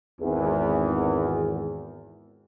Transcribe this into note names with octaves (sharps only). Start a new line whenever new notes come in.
G#1 E2